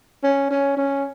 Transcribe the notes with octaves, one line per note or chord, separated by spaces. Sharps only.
C#4
C#4
C#4